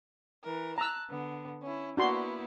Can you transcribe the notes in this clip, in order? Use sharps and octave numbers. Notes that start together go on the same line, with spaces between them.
E3 A#4
A5 A#5 E6 F#6
D3 B3
C#4 E4
A#3 B3 D4 E4 F#4 C6